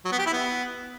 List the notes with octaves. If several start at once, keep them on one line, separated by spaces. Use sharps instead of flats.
F#3
B3
G4
E4
B3